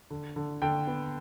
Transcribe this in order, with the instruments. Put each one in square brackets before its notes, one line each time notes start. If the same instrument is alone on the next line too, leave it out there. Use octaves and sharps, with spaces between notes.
[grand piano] D3
D3
D3 G5
B3